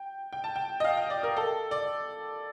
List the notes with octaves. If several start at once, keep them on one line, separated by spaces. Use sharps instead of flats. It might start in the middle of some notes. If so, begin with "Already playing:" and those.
Already playing: G5
G5
A5
G5
D#5
F5
G5
D5
A#4
A4
D5